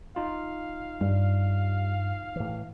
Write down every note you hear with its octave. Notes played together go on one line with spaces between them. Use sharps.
D#4 F4 F5
G2 G3
A2 E3